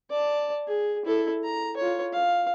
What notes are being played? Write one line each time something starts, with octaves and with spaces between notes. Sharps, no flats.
D5 A5
G#4
E4 A4
A#5
F4 C#5
F5